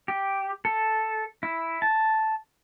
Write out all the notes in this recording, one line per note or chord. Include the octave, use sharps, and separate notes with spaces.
G4
A4
E4
A5